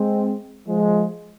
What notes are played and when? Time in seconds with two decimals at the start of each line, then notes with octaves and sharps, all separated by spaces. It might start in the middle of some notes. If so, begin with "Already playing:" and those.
Already playing: G#3 C4
0.68 F3 G#3